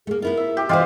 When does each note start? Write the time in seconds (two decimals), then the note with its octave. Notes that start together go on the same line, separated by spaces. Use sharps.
0.07 A3 A#3 G#4
0.22 B3 E4 F4 A#4
0.37 E5
0.57 G4
0.69 E3 F4 G4 G#4 B4 C5 D#5